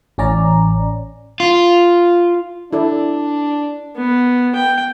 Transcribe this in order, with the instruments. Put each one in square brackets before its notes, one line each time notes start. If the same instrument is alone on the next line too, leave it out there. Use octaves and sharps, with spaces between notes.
[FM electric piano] A1 C#4 D5 A#5
[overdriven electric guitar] F4
[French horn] D4 [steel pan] E4 A4 D5
[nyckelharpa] B3
G5